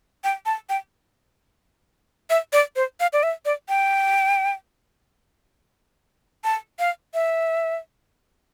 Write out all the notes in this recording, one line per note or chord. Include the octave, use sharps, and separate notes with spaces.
G5
A5
G5
E5
D5
C5
F5
D5
E5
D5
G5
A5
F5
E5